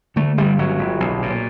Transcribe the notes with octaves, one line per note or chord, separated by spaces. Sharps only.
D3 A3
G1 G3
G1 F#3
G1
B1
A#2